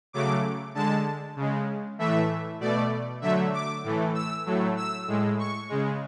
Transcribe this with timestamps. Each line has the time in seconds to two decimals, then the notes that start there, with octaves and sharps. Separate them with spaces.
0.13 C#3 F#3 A3 D6
0.75 D3 G#3 A5
1.36 C#3 G#3
1.99 A2 E3 A3 E5
2.60 B2 A3 D5
3.22 D3 F#3 A3 E5
3.53 D6
3.84 A2 E3 A3
4.15 E6
4.46 A2 F#3 A3
4.77 E6
5.08 A2 G#3
5.39 C#6
5.69 C#3 G#3